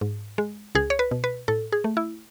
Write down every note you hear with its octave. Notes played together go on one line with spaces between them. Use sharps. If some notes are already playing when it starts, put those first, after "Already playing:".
G#2
G#3
C#2 G#4
C#5
B4
B2
B4
A2 A4
G#4
A3
E4